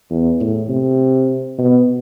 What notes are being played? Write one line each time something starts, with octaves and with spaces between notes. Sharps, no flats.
E2
A2
C3
B2